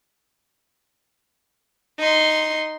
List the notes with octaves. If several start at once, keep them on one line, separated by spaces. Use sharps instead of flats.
D#4 C6